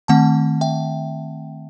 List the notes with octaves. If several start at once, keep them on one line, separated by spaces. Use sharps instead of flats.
D#3 A3 C4 F#5 A5
E5 G5